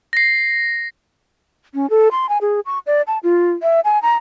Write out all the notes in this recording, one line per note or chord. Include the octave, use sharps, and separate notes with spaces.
A#6 C7
C#4
A4
C6
G#5
G#4
C#6
D5
A5
F4
E5
G#5
A#5